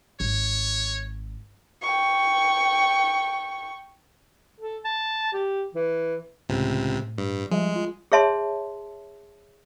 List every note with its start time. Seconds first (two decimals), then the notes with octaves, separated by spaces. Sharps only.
0.20 G#1 C#5
1.82 G5 C#6
4.60 A4
4.85 A5
5.33 G4
5.75 E3
6.49 C#2 A2 C3
7.18 G2
7.51 F3 G3 G#3 E5
7.76 F4
8.12 G#4 C#5 E5 A5 C6